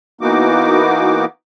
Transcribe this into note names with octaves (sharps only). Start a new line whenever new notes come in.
E3 A#3 B3 D#4 F#4 D6